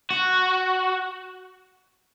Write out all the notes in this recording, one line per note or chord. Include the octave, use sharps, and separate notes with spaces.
F#4